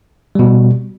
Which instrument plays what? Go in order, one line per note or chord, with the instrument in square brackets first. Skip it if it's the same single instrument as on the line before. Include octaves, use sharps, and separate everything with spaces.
[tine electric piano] B2 G3